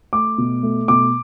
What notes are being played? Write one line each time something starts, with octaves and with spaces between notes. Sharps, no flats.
A3 D6
B2
A3
B2 D6